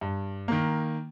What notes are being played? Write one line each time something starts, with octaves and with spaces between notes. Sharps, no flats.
G2
D#3 A#3